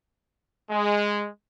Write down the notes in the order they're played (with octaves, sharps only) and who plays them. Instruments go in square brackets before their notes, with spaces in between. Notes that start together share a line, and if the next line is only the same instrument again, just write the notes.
[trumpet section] G#3